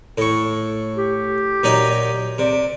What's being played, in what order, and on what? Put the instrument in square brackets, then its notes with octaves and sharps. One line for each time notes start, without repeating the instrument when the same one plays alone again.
[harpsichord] A2 C#6
[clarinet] G4
[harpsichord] A#2 F#3 D#4
[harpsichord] C3 [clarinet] D5